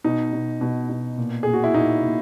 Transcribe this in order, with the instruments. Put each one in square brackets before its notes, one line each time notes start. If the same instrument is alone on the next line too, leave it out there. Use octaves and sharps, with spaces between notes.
[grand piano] B2 D#4
B2
B2
B2
A#2
A#2 G#4
F#4
E4
A#2 D#4
A#2